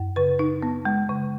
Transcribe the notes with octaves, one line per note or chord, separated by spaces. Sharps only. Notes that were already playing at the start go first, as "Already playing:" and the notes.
Already playing: F#2
C#3 B4
D#4
B3
G#3
C#3